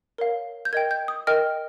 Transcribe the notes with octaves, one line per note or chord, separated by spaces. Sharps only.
A#4 C#5 F5
G6
A#4 D#5 G5 G#6
G6
D#6
A#4 D#5 G5 F6